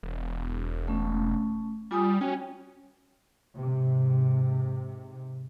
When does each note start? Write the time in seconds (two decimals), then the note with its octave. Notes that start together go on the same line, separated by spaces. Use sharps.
0.03 E1
0.88 A3 C#4
1.91 G3 F4 G#5 D#6
2.21 C#4 F#4 G5 G#5
3.57 G#2 C3